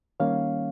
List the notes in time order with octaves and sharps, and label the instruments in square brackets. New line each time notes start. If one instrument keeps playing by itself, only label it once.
[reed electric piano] D#3 G3 A#3 C#4 C#5 F5